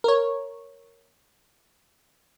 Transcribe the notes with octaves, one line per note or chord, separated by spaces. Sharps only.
A#4 C#5